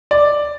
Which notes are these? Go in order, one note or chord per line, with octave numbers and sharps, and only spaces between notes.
D5